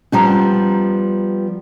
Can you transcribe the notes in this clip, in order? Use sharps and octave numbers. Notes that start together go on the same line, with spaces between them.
F3 G3 B3 C#4 A#5